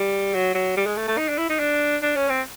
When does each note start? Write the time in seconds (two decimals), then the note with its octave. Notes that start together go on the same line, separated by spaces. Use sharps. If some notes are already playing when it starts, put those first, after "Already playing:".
Already playing: G3
0.34 F#3
0.54 F#3
0.77 G3
0.86 G#3
0.97 A3
1.08 A3
1.17 D#4
1.28 D4
1.38 E4
1.50 D#4
1.59 D4
2.02 D4
2.16 C#4
2.29 C4